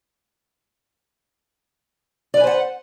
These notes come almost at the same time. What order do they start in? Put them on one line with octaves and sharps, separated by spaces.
D5 B4 G#5 C5 F#5